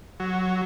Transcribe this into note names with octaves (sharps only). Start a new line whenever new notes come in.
F#3